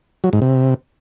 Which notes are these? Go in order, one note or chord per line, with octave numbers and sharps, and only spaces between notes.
F#3
G#2
C3